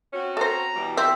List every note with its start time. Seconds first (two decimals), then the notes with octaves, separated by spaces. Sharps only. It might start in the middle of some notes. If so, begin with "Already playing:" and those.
0.13 C4 C#4 F#4
0.37 A4 C5 A#5
0.76 B2 E3 G3
0.97 C4 E5